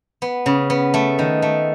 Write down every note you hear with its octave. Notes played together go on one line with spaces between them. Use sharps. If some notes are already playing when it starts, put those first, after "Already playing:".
B3
C#3
B3
A3
D#3
A3